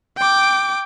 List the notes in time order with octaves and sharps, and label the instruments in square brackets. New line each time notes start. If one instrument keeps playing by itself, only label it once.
[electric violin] G5 D6